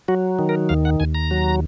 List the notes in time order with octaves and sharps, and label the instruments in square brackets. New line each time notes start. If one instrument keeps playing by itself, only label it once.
[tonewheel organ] F#3 F#4
D#3
A#4
D#2 F5
F#5
D#2 G#5
A#5
F#3